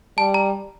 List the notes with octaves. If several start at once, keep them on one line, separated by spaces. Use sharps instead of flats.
G3 A5
A#5